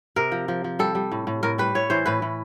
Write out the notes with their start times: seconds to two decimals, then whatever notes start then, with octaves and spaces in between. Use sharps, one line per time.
0.16 C3 A#4
0.32 F3
0.48 F3
0.64 F3
0.79 G3 A4
0.95 G3
1.12 A2
1.27 A2
1.43 A2 A#4
1.58 G3 B4
1.75 A2 C#5
1.90 E3 C5
2.06 A2 B4
2.22 A2